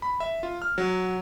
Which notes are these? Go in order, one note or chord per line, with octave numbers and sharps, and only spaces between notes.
B5
E5
F4
F6
F#3